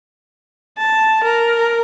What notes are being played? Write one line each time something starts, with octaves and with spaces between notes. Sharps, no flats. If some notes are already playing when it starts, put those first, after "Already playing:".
A5
A#4